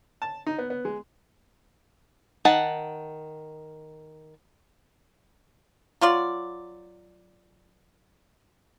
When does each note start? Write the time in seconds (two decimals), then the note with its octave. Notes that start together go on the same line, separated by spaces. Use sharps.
0.22 A5
0.47 D#4
0.58 B3
0.70 B3
0.85 G#3
2.45 D#3 F#5 A5
6.01 F#3 F4 D5